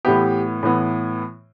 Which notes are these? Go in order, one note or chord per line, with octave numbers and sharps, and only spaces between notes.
A2 E3 B3 G4
A2 E3 B3